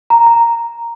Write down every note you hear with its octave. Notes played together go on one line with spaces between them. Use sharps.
A#5
A#5